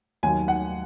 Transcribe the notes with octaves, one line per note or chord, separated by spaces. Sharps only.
D#2 D#3 F#3 G#5
F#5